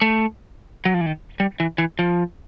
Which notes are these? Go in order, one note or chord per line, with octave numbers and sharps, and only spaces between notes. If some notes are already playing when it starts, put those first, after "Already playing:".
A3
F#3
F3
E3
D#3
G3
E3
E3
F3